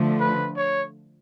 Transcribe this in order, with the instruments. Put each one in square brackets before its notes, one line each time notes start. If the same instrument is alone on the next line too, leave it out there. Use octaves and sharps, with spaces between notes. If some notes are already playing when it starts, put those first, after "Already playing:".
Already playing: [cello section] D3 F3 A3
[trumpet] B4
C#5